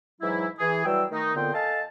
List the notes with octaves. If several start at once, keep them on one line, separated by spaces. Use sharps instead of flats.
G#2 E3 F#3 E4
E3 G#4
E3 F#3 G3 G5 E6
D#3 A3 D#4
F2 A#2 D3 B3 C5 G5
A4 D#5 F5 G#5 A5